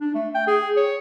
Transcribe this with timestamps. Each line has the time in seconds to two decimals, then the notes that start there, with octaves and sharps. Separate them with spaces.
0.01 D4
0.15 A3
0.35 G5
0.47 G#4
0.77 C#5